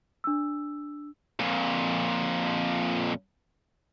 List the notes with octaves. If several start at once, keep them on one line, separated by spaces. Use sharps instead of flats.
D4 E6
F2 A#2